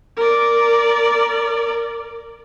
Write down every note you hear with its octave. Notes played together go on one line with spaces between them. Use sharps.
A#4 D5